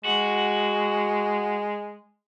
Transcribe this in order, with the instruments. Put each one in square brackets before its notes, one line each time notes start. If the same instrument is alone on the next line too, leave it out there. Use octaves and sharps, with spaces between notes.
[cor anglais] G#3 [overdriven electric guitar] F#4